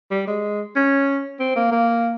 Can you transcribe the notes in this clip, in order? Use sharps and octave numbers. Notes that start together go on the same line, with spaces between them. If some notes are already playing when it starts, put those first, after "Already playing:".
G3
G#3
C#4
C4
A#3
A#3